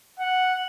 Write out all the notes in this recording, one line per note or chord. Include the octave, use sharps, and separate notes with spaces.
F#5